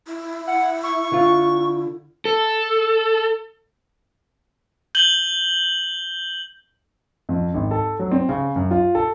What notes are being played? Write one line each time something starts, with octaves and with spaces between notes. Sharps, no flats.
E4
F#5
C#6
D3 F4
A4
G6 F#7 G7
F2
G#1
A4
F#3
C4
C#3
F#2
F4
A4